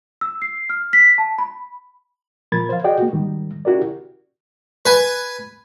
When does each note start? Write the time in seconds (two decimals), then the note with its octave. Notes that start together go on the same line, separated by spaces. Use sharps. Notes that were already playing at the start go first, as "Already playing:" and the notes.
0.21 E6
0.42 C7
0.70 F6
0.93 B6
1.18 A5
1.38 B5
2.52 A#2 F3 A#4 B5 G#6 A6
2.69 C5 F5
2.84 F#4 G#4 D5 D#5 F#5 G5
2.99 A#3 F#4
3.12 G#2 D#3 G3
3.65 C#4 E4 F#4 G4 A#4 D5
4.86 B4 G#5